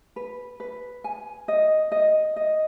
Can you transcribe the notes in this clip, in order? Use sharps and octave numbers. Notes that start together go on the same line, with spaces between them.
B4
B4
G#5
D#5
D#5
D#5